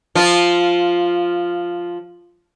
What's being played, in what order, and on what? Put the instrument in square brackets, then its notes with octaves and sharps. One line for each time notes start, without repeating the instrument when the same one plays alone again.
[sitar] F3 F4